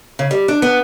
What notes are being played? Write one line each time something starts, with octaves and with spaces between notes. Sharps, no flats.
C#3
G3
D4
B3